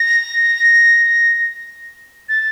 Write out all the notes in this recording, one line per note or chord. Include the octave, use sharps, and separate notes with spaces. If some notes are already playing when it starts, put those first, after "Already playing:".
Already playing: A#6
A6